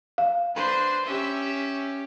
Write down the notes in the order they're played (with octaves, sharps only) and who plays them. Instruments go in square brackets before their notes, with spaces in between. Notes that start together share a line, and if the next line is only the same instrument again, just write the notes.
[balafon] F5
[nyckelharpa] D4 [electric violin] B4 C5
[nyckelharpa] C#4 G4 [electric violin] E5